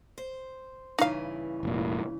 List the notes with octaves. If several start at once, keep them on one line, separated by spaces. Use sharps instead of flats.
C5
G2 C#3 E3 D#4 F5
F1 A#2